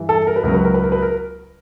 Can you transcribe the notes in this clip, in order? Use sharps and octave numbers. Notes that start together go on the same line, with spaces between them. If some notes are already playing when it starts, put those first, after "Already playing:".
Already playing: G2 E3
A4
A#4
B4
C#2 C#3 F#3 A#4
B4
A#4
B4
A#4
B4
A#4